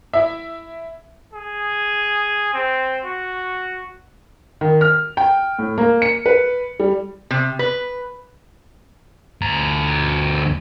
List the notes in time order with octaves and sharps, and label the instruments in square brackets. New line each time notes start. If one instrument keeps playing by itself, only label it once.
[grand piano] E4 E5
[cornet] G#4
C4
F#4
[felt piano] D#3
F6
G5
A2
A#3
C#7
B4
G3
[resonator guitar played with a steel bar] C3
B4
[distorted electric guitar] D2 A#5